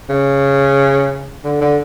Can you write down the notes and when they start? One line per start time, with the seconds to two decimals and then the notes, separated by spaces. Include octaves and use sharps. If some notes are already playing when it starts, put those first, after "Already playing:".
0.10 C#3
1.44 D3
1.61 D3